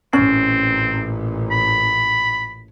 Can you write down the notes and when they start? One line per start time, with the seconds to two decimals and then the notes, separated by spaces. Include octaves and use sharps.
0.13 A1 A#2 C4 C#4
1.51 B5